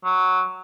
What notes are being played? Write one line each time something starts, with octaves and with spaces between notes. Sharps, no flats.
F#3